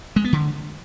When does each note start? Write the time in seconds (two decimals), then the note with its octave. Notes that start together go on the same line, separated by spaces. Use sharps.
0.16 G#3
0.24 B3
0.33 D3